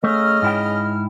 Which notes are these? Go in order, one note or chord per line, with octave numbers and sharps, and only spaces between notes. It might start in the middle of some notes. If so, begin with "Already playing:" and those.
C#3 A3 D#5 F6
G#2 E4 G5